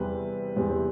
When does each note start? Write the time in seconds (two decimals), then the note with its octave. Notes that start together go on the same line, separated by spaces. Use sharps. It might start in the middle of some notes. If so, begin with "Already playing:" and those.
Already playing: E2 C3 G3 C4 B4
0.56 E2 C3 G3 C4